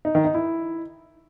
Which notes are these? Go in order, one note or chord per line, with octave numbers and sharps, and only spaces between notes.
D#4
D#3
D#4
E4